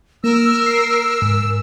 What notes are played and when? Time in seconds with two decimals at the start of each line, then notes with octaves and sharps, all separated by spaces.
0.24 A#3 A#4 E6
0.66 C7
1.22 G#2